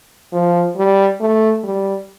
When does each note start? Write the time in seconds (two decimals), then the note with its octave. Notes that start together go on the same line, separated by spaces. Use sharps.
0.32 F3
0.77 G3
1.21 A3
1.64 G3